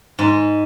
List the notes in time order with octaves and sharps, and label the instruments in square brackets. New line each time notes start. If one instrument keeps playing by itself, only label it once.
[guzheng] G#2